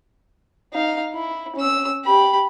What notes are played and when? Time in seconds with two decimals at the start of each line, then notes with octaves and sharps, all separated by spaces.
0.73 D#4 F5
1.14 E4
1.56 C#4 E6
2.05 G4 B5